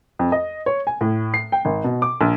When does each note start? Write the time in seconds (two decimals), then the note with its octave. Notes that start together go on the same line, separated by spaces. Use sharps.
0.19 F2
0.32 D#5
0.66 C#5
0.87 G#5
1.01 A2
1.34 C7
1.52 G5
1.65 G#1
1.84 B2
2.02 D6
2.21 A#1